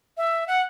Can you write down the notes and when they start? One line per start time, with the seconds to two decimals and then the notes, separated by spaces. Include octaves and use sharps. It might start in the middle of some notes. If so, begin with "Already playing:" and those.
0.17 E5
0.47 F#5